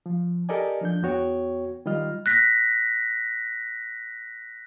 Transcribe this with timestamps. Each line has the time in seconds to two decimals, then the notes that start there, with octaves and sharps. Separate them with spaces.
0.06 F3
0.49 G4 A4 A#4 D5 D#5 G#5
0.81 F3 D4 G6
1.02 E2 B3 F#4 C#5 G5
1.86 D#3 G3 F4 D#5 F6
2.26 F#6 A#6 B6